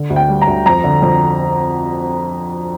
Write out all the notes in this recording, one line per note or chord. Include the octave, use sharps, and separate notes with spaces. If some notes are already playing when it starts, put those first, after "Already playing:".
Already playing: D3
D2
G5
G3
A#5
D2
F2 A#5
D3
F2